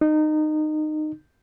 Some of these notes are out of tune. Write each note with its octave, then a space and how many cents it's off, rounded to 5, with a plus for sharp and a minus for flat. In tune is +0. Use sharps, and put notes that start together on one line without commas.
D#4 -20